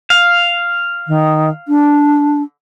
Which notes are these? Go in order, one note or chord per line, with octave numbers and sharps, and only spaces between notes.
F5
D#3
D4